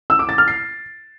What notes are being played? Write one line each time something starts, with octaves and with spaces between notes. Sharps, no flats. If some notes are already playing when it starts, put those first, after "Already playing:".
E6
D6
A6
F6
C7